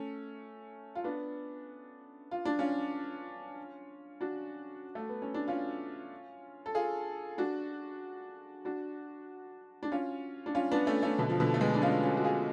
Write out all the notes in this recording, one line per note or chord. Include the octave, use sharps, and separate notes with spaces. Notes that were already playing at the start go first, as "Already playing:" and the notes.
Already playing: A3 C#4
F4
B3 D4
F4
D4
C#4 F4
D4 F#4
A3
B3
C#4
D4
C#4 F4
A4
F4 G#4
D4 F#4
D4 F#4
D4
C#4 F4
D4
C#4 F4
B3 D4
A3 C#4
A3 C#4
B2 D3
F3
B2 D3
A3
G#3 B3
D4
C#4 F4
C#4 F4
F#4
F4 G#4